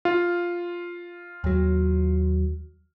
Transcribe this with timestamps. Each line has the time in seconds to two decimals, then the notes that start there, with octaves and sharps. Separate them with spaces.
0.05 F4
1.44 D#2 F#3